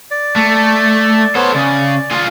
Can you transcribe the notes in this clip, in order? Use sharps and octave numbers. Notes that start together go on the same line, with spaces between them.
D5
A3
B3 A4 C5 C#5
C#3 D5
F4 G#4